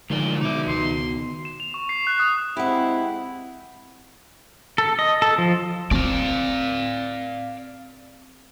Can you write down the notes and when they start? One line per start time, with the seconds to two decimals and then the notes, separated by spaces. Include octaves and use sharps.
0.10 A2 D3 D#3 F3 G#3 F4 D5 G7
0.41 B2 D#4 E5 D6
0.67 C#2 D#3 C6
1.45 E7
1.60 F7
1.74 C#6
1.89 C7
2.07 F#6
2.20 D#6
2.57 G#3 C4 E4 G4 F#5
4.78 A4
4.99 D#5
5.22 A4
5.38 F3
5.91 C4 D5 F5